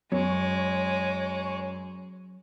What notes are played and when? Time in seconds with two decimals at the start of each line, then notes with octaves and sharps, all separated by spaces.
0.12 F#2 F#3 G#3 C#5